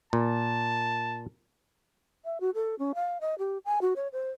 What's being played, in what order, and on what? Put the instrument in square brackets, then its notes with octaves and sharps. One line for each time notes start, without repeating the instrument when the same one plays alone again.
[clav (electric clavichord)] A#2 [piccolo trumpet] A5
[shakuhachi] E5
F#4
A4
C#4
F5
D#5
G4
G#5
F#4
C#5
C5